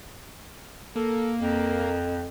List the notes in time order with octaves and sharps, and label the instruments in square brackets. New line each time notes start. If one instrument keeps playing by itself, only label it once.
[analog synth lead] A#3 [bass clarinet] A4
[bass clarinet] F2